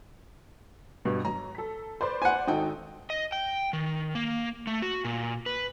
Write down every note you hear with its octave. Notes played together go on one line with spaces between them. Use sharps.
G2 B2
F#3 A#5
A4 B6
B4 C5 D5 C6
F#5 G#5
G#1 D#4 A4 G5
D#5
G5
D#3
A#3
A3
F#4
A#2
B4